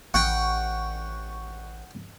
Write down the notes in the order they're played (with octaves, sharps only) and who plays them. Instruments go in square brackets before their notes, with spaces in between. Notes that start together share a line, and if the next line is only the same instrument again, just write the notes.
[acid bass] A1 [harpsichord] F#5 G5 [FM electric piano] C#6